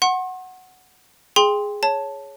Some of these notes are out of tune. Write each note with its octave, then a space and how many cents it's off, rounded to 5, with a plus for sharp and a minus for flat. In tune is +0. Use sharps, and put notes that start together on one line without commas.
F#5 +0 C6 +45
G#4 +0 G5 +25 C6 +0
C#5 +0 A5 +0